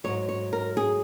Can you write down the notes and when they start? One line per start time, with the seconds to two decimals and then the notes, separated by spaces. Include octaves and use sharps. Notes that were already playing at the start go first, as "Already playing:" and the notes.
0.04 G#2 F#3 C#5
0.29 C#5
0.53 A#4
0.77 G#4